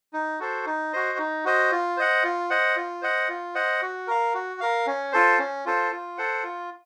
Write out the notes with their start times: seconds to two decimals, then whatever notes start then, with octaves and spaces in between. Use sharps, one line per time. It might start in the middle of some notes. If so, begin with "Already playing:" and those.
0.13 D#4
0.39 F#4 A4 C5
0.66 D#4
0.92 F#4 C5 D#5
1.18 D#4
1.45 F#4 C5 D#5
1.71 F4
1.97 C5 D#5 F#5
2.24 F4
2.50 C5 D#5 F#5
2.76 F4
3.02 C5 D#5 F#5
3.29 F4
3.55 C5 D#5 F#5
3.82 F#4
4.07 A#4 F5
4.34 F#4
4.60 A#4 F5
4.86 C#4
5.12 F4 A4 C5
5.39 C#4
5.66 F4 A4 C5
5.92 F4
6.18 A4 C5 F#5
6.44 F4